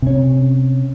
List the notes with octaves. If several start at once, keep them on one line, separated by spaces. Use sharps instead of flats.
C3 C#4